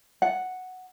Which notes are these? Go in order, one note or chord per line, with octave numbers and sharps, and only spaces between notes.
F#5